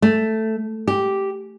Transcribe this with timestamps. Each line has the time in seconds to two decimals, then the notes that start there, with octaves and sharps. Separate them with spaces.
0.02 A3
0.88 G4